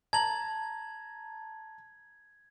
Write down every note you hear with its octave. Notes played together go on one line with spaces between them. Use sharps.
A5 A#5 G#6 F#7